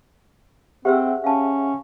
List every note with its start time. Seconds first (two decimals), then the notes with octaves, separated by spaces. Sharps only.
0.85 C4 G4 G#4 C5 E5 F#5 E6
1.24 C#4 F5 A5